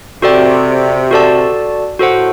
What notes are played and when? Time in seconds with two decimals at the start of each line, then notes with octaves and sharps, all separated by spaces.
0.22 C3 F#4 A4 D5 G5
1.11 F#4 A4 D5 A5
1.99 A2 F#4 A4 C5 F#5